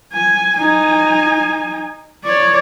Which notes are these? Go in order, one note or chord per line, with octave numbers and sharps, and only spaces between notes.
G#5
D#4 G#5
C#5 D5